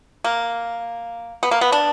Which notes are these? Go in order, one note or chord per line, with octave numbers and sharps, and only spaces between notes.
A#3
B3
A#3
B3
D4